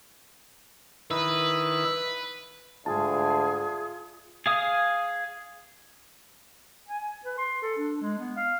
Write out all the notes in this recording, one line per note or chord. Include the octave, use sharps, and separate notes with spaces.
D#3 E4 B4
D2 G#2 F4 G#4 G#5 A5
G#4 F5 D#6
G#5
B4
C6
A4
D4
G#3
B3
F5